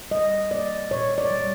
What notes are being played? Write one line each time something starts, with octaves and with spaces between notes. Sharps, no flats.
G3 D#5
A#3 D5
A#2 C#5
D5
G3